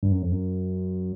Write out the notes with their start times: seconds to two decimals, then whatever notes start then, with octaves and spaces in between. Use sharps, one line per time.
0.03 G2
0.11 F#2
0.22 F2
0.32 F#2